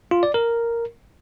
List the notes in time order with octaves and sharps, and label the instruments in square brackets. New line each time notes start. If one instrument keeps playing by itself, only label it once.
[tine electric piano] F4
D5
A#4